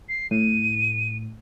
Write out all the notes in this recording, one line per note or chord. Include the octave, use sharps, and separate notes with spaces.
C7
A2 D#7